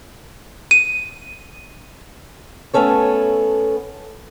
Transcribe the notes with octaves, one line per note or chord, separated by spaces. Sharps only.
D#7
A3 B3 C#4 A4 C#5